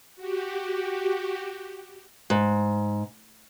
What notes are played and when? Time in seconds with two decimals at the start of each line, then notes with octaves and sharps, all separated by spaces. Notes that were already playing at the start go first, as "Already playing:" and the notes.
0.16 F#4 G4
2.30 G#2